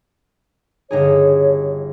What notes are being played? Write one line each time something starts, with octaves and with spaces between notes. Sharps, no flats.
G1 D#4 G#4 C#5